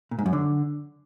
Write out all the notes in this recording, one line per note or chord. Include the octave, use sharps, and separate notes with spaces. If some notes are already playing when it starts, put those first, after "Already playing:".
A#2
G#2
F#2
D3